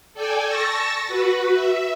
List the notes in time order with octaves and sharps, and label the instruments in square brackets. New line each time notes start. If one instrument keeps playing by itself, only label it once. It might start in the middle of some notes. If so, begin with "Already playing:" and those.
[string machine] A4 D5 G5 G#5
A5 C#6 E6 A6 A#6
F#4 B4
E5